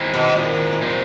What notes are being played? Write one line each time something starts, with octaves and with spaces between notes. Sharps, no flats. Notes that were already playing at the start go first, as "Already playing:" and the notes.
Already playing: D#3 G#3 C4 E4
B2
A#2
C3 F3 G#3 C4 D#4